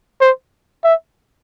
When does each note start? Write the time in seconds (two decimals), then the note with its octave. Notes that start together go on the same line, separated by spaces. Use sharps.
0.21 C5
0.84 E5